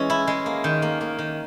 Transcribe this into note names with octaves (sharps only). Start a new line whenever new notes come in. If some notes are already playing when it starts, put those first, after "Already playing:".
Already playing: E3 G#3 C#4
E4
G#3
A#3
D#3
A#3
A#3
D#3